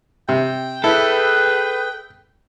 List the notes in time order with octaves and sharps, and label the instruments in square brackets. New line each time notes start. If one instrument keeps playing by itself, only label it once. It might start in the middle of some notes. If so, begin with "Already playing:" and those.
[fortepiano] C3 [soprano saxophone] G5
[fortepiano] E4 [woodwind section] G#4 B4 [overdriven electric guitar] A4